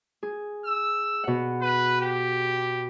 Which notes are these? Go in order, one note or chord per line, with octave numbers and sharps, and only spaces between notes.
G#4
E6
B2 F#5
B4
G4